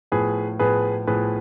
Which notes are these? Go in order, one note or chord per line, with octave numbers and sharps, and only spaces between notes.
A2 F3 B3 G#4 B4
A2 F3 B3 G#4 B4
A2 F3 B3 G#4 B4